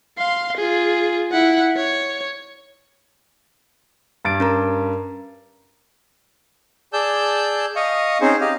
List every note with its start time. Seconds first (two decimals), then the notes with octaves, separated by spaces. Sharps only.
0.18 F5 C6
0.57 F4 G#4
1.32 E4 F#5
1.77 C#5
4.25 G2 A6 D7
4.40 C#4 A#4 A#5
6.93 G#4 D5 A5 E6 G6
7.76 D#5 F5 C#6 D#6
8.21 C4 C#4 D#4 G#4 C5
8.41 G4 D#5 F5